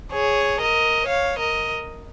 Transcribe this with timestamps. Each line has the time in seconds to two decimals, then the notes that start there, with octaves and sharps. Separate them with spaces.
0.12 G#4 C#5
0.59 A#4 D#5
1.06 C#5 F5
1.38 A#4 D#5